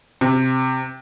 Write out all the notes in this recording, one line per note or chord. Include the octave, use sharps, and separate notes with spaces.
C3